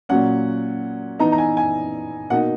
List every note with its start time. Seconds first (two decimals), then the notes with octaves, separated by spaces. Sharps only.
0.09 A#2 F#3 C#4 F#5
1.19 E3 B3 D#4 A#5
1.32 A#5
1.38 G#5
1.57 G#5
2.30 B2 A#3 D#4 F#5